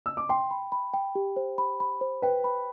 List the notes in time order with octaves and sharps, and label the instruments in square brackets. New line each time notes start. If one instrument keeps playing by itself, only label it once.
[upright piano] E6
D6
[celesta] G5 [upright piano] C6
[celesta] B5
B5
G5
G4
C5
B5
B5
C5
[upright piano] B4 [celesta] G5
[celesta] B5